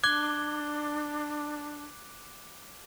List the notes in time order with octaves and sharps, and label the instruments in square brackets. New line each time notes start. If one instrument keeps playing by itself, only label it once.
[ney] D4 [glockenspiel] D6 F#6 G7 [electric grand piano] G#6